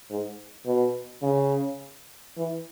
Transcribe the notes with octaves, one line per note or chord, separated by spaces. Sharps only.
G#2
B2
C#3
E3